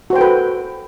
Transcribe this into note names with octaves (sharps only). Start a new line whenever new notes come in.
F#4 A4 B4 C5 G5